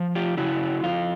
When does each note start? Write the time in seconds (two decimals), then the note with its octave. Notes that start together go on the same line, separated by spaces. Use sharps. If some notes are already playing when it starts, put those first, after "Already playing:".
Already playing: F3
0.15 F4 G4
0.37 C#3 E4 F#4
0.83 F2 F4